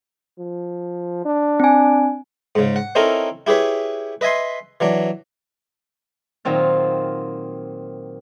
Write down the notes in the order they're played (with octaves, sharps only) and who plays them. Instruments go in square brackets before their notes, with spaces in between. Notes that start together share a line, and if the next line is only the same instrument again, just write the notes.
[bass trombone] F3
D4
[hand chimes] C4 G#5
[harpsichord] G#2 C#3
F#5
C4 C#4 D#4 E4 A4 A#4
E4 G4 G#4 B4 C#5
B4 D#5 E5 G#5 C6
E3 F#3 D4
[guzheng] A#2 D#3 F#3 C4 F4